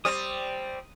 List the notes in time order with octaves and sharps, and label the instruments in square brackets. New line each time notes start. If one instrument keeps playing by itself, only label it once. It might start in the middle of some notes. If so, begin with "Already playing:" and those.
[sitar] G3 C4 [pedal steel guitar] D#6